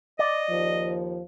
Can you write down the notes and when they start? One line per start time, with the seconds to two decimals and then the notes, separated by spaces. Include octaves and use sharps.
0.19 D5 D#5
0.49 D#2 F3